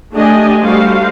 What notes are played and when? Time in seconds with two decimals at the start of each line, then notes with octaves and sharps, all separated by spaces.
0.13 A3 D4 G4 D#5 G#5
0.61 G3 A3 F#4 C5 F5